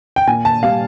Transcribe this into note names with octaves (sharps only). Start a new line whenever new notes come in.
G5
A#2 G#5
A5
G3 F5